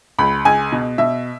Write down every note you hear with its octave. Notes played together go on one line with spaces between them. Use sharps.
C#2 B5
C#2 G#5
B2
B2 E5